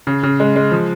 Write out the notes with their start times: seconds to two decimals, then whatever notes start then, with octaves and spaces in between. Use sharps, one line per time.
0.07 C#3
0.23 C#3
0.40 G#3
0.56 G#3
0.72 F3